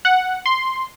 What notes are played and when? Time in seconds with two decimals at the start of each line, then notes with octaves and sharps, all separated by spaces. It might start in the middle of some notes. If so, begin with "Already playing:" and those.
0.05 F#5
0.46 C6